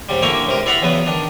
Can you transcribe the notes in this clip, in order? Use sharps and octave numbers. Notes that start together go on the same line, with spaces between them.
G#2 C#3 G3
D3 A#3 E4 G5 A#5 C#6
C#2 C3 A#4
E4 D5 F5 F#5 A#5 B5
E2 C#3 F#3 B3 B4
D#3 D4